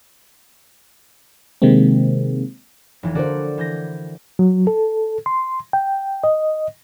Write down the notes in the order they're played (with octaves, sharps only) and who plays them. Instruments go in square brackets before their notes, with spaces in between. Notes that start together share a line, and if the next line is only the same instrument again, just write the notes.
[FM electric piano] C3 D#3 G#3 A#3 C4
[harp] F1 E3
[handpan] D3 A#4 C5 [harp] F#4 A4 D5
[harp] E3 G6 A#6
[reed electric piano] F#3
A4
C6
G5
D#5